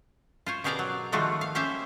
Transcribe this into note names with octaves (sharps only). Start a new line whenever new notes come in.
F4 C5 C#5
B2 G4 G#4 A#4 D5 A#5
F#3
D#3 F3 G3 A3 F4 F#4
F5
A#3 C#4 G4 C5 E5 G5